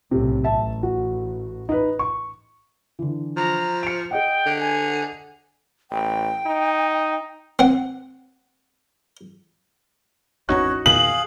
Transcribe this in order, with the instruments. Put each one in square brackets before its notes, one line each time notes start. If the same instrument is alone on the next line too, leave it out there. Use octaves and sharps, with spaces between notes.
[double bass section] B1 A2 [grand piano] C3
[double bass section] A1 [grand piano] E5 A5
[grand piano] F#4
D#4 B4
C#6
[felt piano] D3 E3
[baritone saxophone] F3 [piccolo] A#5
[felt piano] C#7 D7
[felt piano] G#4 D#5 F#5 [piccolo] G5
[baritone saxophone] D3
[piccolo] G#5
[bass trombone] A1 [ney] G5
[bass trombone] D#4
[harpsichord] C4 F#5
[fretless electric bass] G#1 E2 C#4 [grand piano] D#4 F#4 F#6 [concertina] C#5
[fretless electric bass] E2 A#2 D#3 [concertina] G#4 F5 [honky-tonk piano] F#7